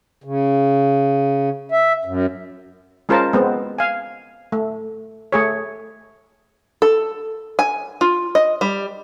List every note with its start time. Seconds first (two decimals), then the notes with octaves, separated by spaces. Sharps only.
0.24 C#3
1.72 E5
2.05 F#2
3.09 G#3 C#4 F4 A#4 C5 A5
3.33 G#3 B3 C4
3.79 F5 G#5
4.52 A3
5.32 A3 G#4 C#5
6.82 A4
7.59 G#5
8.01 F4
8.35 D#5
8.61 G3